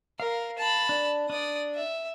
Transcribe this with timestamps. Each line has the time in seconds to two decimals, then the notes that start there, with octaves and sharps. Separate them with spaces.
0.20 A#4 F5
0.58 A5 B5
0.89 D4
1.30 D4 D5 D#6
1.75 E5